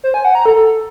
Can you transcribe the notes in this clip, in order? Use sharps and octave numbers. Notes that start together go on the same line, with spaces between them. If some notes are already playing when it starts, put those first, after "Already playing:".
C5
G#5
F#5
A#5
A4